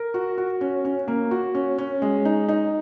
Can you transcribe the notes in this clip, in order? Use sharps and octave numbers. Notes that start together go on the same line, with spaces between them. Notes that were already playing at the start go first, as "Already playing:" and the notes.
Already playing: A#4
F#4
F#4
C#4
C#4
A#3
F#4
C#4
C#4
G#3
D#4
D#4